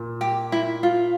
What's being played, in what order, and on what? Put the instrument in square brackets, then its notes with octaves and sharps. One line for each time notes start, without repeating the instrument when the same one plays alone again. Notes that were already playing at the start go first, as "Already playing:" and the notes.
Already playing: [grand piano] A#2
[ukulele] G4
E4
F4